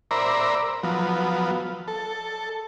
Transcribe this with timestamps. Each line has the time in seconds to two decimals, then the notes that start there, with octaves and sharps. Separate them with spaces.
0.11 A#4 C5 D5 E5 A#5 B5
0.83 F3 F#3 B3
1.88 A4